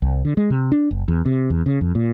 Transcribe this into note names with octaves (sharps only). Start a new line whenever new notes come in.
C2
D3
G#3
C3
D4
F#1
E2
C3
E2
C#3
F2
A#2